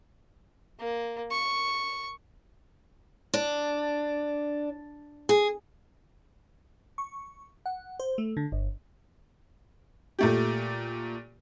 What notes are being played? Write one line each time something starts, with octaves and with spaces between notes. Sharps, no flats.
A#3
C#6
D4
G#4
C#6
F#5
C5
A3
D3
G1
A#2 A3 G4